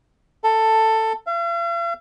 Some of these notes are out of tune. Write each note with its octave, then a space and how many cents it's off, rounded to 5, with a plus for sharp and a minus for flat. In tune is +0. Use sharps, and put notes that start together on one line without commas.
A4 +10
F5 -45